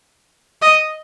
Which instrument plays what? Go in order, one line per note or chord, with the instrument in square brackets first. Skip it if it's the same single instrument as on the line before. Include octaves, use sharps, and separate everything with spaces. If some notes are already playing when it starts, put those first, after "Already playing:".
[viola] D#5